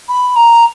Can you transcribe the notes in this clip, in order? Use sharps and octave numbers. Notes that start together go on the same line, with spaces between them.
B5
A#5